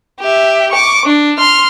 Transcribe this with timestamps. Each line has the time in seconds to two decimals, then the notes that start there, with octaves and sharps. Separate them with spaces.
0.20 G4 E5
0.72 C#6 D6
1.05 D4
1.38 C6 F6